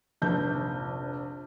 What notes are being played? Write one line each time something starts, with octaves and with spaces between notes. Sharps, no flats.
F1 A#1 G6